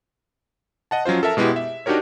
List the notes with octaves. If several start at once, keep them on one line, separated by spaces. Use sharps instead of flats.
D#5 F#5 A5
F3 F#3 C#4 F4 C5
A4 A#4 E5 A5
B2 G#3 B3 E4 G4
E5
D4 D#4 F#4 G4 A#4 C#5